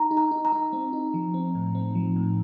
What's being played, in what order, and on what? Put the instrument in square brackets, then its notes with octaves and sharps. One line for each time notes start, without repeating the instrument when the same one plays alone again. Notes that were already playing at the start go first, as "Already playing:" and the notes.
Already playing: [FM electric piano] D#4 [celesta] A#5
[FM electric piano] D#4
[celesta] A#5
[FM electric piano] D#4
[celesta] A#5
[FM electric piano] D#4
C4
D#4
F3
C4
A2
C4
F3
A2